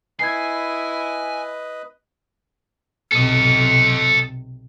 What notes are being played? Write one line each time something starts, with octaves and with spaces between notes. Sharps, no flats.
E4 B4 D#5 G#5 G#6 C7
B1 C3 A4 D#5